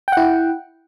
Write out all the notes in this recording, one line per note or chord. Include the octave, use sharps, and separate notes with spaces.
E4 F#5 G5